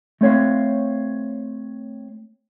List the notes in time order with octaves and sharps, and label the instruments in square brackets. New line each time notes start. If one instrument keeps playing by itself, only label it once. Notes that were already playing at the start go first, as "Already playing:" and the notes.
[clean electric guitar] A3 C4 C#5 F5